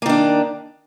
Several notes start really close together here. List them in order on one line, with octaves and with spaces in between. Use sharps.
A#3 D#3 D4